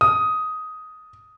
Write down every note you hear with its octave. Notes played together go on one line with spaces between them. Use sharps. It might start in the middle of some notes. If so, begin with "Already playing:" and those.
D#6